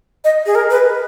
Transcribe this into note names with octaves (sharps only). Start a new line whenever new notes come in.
D#5
G#4
A#4
B4